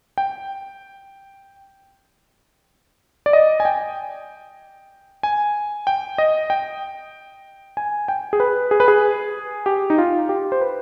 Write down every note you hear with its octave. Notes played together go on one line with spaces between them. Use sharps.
G5
D5
D#5
G#5
G5
G#5
G5
D#5
G5
G#5
G5
G#4
B4
G#4
B4
G#4
G4
D#4
F4
G4
C5
B4